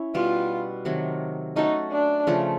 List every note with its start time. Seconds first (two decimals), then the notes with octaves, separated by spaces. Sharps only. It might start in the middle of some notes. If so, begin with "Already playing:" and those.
Already playing: C#4 E4
0.14 B2 G3 B3 F4
0.85 C3 D#3 F#3 A3
1.56 A3 C#4 D#4 F#4 A4
1.91 D4
2.27 C#3 F3 A3